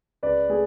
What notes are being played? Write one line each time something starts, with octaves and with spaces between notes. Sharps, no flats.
C#2 B4 D5
A3 G#4